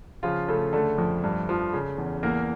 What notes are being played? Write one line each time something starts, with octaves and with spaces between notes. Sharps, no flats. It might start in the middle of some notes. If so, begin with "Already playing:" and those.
C#3 F3 F4
C#3 A3 A4
D3 A3 A4
F2
G2
F3
C#3
E2
E2 A#3 A#4